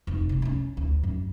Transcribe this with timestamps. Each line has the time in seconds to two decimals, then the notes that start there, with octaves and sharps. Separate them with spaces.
0.07 F1
0.29 C3 E3
0.42 C#4 D4
0.77 D2
1.03 F#2